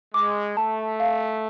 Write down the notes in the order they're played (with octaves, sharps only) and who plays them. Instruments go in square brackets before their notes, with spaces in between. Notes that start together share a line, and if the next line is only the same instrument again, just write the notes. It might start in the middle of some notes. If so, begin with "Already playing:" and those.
[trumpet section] G#3 [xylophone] D6
[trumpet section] A3 [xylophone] A5
[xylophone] F5